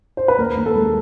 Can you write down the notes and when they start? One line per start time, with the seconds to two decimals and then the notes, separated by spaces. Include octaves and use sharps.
0.17 C5
0.28 B4
0.38 D#2 A#4
0.57 D#2
0.66 A4
0.75 G#3